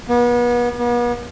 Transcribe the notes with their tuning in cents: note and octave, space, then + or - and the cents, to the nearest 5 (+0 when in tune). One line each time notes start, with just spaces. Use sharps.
B3 -35
B3 -40